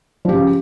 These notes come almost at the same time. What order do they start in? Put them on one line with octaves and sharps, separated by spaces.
F3 G4 C#3